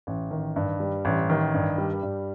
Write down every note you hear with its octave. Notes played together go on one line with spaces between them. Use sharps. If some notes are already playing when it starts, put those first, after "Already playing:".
A1
D#3
G2
G3
A1
D#3
G2
G3
G2